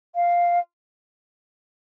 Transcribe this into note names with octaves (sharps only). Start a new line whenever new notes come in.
F5